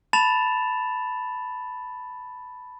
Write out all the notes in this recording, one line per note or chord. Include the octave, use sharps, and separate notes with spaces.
A5 B5 A6 E7 F7